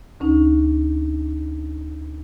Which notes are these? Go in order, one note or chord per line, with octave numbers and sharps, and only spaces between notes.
D2 C#4 D#4